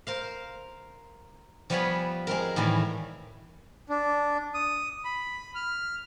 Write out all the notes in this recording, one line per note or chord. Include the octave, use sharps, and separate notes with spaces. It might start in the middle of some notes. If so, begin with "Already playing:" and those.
A#4 C5 F5
F3 G3 B3 C#5 G#5 B5
G#3 C4 A#4
A2 D#3 E3 G3 G#5
D4
D#6
B5
F6